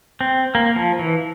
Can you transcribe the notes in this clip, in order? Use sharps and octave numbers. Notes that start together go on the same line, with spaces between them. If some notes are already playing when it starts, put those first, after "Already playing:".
C4
A#3
F3
E3